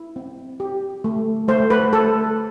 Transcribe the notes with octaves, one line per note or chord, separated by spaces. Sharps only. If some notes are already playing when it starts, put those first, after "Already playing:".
Already playing: E4
C4
G4
A3
A3 C5
B4
A3 A4